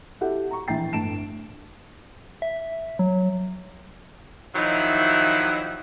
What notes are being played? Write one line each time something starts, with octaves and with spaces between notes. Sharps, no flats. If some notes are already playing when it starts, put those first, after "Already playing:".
E4 F#4 G4 A4 E5 F#5
A#5 C#6
A#1 E3 G5 A#5 A6 C7
G1 A2 A5 D7 E7
E5
F#3
D#3 F3 F#3 D#4 E4